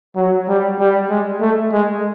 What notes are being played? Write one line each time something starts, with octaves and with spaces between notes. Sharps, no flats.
F#3
G3
G3
G#3
A3
G#3